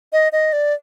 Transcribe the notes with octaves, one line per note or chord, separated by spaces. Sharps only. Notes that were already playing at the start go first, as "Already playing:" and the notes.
D#5
D#5
D5